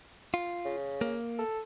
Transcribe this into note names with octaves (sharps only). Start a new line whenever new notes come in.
F4
C#3
A#3
A4